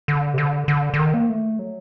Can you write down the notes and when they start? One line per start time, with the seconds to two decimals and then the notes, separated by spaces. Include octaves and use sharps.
0.08 D3
0.34 C3
0.38 D3
0.68 D3
0.94 D3
0.99 D#3
1.14 A#3
1.29 A3
1.59 F#3